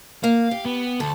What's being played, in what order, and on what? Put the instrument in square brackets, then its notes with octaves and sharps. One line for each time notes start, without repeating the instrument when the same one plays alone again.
[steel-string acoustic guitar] A#3 [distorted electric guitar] F5
[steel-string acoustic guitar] G4
[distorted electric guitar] B3
[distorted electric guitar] D2 [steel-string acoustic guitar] A4